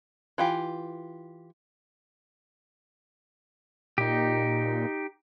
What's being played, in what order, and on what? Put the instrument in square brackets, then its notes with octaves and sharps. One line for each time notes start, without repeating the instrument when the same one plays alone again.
[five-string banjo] E3 F4 G4
[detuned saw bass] A#2 [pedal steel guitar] D#4 G4